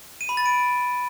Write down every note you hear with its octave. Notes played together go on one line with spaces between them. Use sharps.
D#7
B5
A6
D7